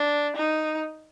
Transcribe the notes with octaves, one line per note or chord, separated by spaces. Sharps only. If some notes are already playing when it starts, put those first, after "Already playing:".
Already playing: D4
D#4